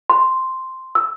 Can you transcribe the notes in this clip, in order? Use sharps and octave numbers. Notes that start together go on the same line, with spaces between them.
C6
E6